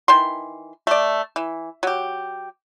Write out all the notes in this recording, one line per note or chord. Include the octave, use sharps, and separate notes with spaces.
D#3 E3 C6
A3 D5
E3
F#3 G4